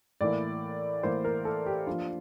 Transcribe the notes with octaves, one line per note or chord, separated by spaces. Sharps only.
A2 E3 A#3 E4 D5
A2 E3 A#3 E4 C5
A#4
A4
G4
F3 A#3 D4 F4